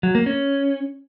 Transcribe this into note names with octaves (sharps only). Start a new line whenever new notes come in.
F#3
A#3
C#4